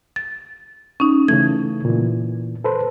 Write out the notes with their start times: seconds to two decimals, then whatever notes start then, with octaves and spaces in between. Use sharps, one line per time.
0.16 A6
1.00 C#4 D#4
1.28 C#3 E3 A3 G#6
1.85 A#2 E3
2.64 A4 B4 C5